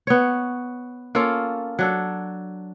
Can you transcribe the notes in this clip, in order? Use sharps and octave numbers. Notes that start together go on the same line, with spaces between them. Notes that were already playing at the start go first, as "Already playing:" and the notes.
B3 C#5
A#3 C#4 F4 A4
F#3 D4 A4